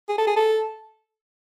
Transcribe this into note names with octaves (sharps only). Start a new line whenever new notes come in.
G#4
A4
G#4
A4